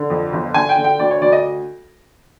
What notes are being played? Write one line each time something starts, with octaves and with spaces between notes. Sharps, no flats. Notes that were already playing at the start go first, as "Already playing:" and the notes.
Already playing: D3
F2
G1
D3 G#5
G5
D3
G5
D2 D5
C#5
D2 D5
D#5